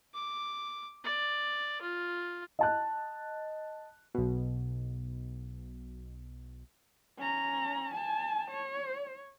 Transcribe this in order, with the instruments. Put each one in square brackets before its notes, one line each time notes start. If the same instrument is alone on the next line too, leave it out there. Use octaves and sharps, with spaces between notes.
[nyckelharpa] D6
D5
F4
[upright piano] D#5 A5 F#6
[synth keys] B1 B2
[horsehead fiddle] C#4 A#5
G#5 A5
C#5